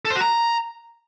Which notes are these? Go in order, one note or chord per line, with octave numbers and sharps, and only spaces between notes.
A4
C5
F#4
A#5